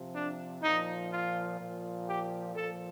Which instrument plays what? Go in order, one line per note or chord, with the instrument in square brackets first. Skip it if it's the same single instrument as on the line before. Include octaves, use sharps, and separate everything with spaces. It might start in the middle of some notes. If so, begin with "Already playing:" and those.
Already playing: [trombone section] C3 F3
D4
A#2 F3 D#4
F4
A#2 F3
G4
A#2 F3 A4